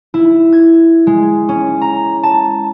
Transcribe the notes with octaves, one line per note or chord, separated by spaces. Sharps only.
E4
G#6
G#3
C#4
A#5
A5